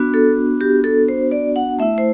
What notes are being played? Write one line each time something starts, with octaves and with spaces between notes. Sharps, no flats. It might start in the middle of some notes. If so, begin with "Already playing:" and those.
Already playing: B3 D4 F#4
A4
G4
A4
C5
D5
F#5
A3 E4 E5
C5